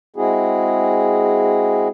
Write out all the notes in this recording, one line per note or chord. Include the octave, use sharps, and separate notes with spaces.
G#3 C4 E4 F#4 G#4